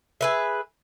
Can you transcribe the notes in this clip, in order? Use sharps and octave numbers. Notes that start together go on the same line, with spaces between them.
G#4 B4 E5